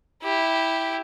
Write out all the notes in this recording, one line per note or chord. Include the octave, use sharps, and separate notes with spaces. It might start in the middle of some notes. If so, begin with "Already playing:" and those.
E4 G4